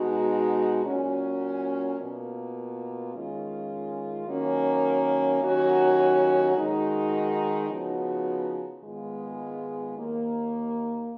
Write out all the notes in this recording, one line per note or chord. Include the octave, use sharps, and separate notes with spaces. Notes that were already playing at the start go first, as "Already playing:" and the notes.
Already playing: B2 G#3 D#4 F#4
A#2 F#3 C#4
B2 A#3 F4
D#3 G#3 C#4 F4
D#3 F#3 A#3 C#4
D#2 D#3 F#3 C#4 F#4
D#3 G#3 D#4 F#4
C#3 F3 B3 D#4 F#4
G#2 D#3 G#3 B3 F4
D#2 D#3 A#3